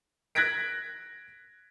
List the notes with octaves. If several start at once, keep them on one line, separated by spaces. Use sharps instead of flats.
F#6 G#6 A#6 B6 D7